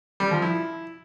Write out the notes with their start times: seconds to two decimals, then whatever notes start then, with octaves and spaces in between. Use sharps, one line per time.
0.20 G3
0.31 F3
0.42 E4